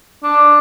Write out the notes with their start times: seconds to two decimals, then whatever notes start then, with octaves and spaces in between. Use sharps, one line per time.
0.23 D4